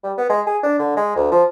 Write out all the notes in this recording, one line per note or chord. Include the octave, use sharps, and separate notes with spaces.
G3
B3
G#3
G#4
D4
D3
G#3
D2
F3